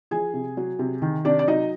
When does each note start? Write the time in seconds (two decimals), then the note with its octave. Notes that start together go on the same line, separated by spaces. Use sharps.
0.11 F3 G#4 G#5
0.34 C3
0.57 F#3
0.79 C3
1.02 D#3
1.25 C3 D4 D5
1.39 D5
1.48 F#3 D#4 D#5